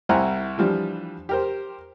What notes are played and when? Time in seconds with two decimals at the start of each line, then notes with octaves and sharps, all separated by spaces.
0.09 C2 E4 C5 F#5 G#5 A#5
0.58 E3 F3 G3 D4
1.29 G4 A#4 C5